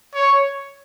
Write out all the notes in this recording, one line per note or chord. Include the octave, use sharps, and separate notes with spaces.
C#5